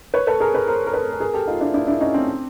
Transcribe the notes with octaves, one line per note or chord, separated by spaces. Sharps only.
B4 C#5
A4 B4
G#4 A#4
A4 B4
A#4 C5
A#4
A4 B4
A4
G#4 A#4
G4 A4
D#4 F4
D4 E4
D4 E4
D4 E4
C#4 D#4
C4 D4